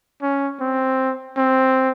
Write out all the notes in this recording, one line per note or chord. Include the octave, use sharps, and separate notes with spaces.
C#4
C4
C4